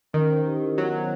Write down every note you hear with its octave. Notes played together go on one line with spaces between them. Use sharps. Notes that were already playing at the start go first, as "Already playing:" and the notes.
D#3 C#4
C5
G4
E4
F#3 B3
C5